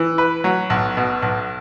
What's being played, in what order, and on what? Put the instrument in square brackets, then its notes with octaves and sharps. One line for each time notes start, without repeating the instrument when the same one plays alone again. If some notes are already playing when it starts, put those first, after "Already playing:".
Already playing: [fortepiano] E3
B4
F#3
B1
B2
B1